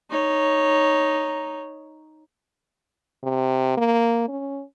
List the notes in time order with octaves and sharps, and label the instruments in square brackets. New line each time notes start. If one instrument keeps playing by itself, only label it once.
[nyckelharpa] D#4 C#5
[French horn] C3
A#3
C#4